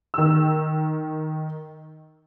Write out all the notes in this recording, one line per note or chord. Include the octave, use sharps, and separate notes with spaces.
D#3 E6